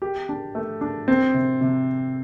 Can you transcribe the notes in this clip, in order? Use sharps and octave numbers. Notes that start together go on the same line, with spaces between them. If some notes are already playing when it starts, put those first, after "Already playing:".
G4
D4
A3
D4
C4
C3
C3